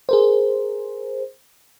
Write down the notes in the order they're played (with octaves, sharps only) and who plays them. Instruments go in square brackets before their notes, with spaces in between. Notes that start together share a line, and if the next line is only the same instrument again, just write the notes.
[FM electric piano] G#4 A#4 C5